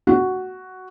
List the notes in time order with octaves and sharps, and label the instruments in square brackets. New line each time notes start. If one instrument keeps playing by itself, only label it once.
[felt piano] F#4